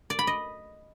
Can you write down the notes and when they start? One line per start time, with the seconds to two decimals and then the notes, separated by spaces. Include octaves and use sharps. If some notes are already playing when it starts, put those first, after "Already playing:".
0.10 D5
0.19 B5
0.27 D#5